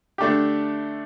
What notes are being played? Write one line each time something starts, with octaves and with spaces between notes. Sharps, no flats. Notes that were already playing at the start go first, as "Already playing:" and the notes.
D3 A3 D4 G4